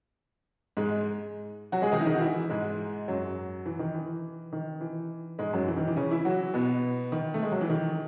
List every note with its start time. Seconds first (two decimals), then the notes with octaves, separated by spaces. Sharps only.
0.77 G#2 G#3
1.72 F#3 F#4
1.82 G#3 G#4
1.92 D#3 D#4
2.01 E4
2.06 D#3 D#4
2.15 F#4
2.21 E3 E4
2.50 G#2 G#3
3.08 F#2 F#3
3.66 E3
3.79 D#3
3.94 E3
4.53 D#3
4.81 E3
5.39 G#2 G#3
5.53 F#2 F#3
5.67 E3
5.77 D#3
5.87 E3
5.96 C#3 C#4
6.11 E3 E4
6.25 F#3 F#4
6.54 B2 B3
7.12 D#3
7.34 A3
7.43 G#3
7.52 F#3
7.61 E3
7.70 D#3